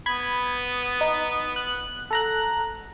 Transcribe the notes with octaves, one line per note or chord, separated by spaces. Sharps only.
B3 B5 G#6
D#4
F#6
A4 F#5 A#5 F#6